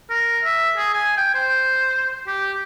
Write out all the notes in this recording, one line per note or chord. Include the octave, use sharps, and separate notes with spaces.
A#4
E5
G#4
G#5
G5
C5
G4